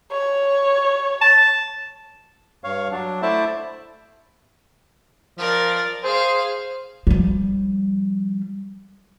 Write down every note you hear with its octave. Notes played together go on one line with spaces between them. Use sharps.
C#5
A5
G2 C#5 F5
F#3 D4
A3 E4 C5 D5 E5 A5
F3 A#4 D5
G#4 C5 F5
F3 G3